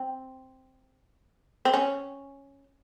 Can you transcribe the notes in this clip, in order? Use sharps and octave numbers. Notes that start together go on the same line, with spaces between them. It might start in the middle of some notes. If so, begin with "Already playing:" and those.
Already playing: C4
C4
C#4